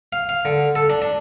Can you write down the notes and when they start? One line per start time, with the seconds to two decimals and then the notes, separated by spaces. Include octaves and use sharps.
0.13 F5
0.29 F5
0.45 D3
0.76 A4
0.90 D4
1.02 D4